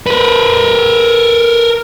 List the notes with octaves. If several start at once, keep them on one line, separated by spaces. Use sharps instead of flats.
A#4 B4